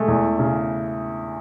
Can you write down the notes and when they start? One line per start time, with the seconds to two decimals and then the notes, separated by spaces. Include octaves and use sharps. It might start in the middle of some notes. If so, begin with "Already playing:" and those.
Already playing: G#3 A3
0.08 E2
0.39 C#3